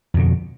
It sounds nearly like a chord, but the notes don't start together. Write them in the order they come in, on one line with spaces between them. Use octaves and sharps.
F2 B2 D3